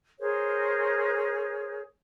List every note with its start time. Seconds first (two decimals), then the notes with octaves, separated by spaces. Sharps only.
0.20 G#4 A#4 C5 C#5